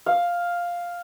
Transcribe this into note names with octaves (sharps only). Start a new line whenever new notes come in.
F5